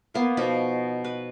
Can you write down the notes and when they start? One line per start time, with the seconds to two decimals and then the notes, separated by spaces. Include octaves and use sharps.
0.14 A#3 B3 F4
0.37 B2 F3 D#4 B5
1.05 B4